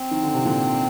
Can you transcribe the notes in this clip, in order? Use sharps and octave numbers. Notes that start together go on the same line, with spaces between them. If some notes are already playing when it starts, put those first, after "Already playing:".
Already playing: C4
D#3
D3
C3
A#2 D3